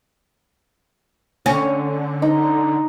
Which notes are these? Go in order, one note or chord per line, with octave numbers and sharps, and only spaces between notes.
D3 C#4
D#4